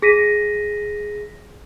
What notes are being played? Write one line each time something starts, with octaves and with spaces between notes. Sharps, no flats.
G#4 A#6 B6 D#7